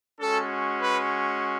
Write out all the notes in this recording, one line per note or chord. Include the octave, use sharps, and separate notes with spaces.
G#3 C#4 F#4 A4
B4